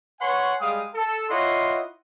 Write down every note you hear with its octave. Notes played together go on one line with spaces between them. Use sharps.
B4 C#5 F#5 G#5 C6 C#6
G3 G#3 F5 G5 D#6
A4
E4 F4 C#5 D#5 F#5 C6